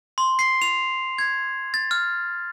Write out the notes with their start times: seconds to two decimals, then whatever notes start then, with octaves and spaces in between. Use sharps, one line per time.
0.18 C6
0.39 C7
0.62 F7
1.18 G#6
1.74 A6
1.91 F6